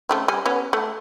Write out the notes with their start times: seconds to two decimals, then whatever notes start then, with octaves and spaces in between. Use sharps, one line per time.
0.09 C#3 A3 C4
0.28 G3 G#5
0.46 B3 C#4
0.73 A3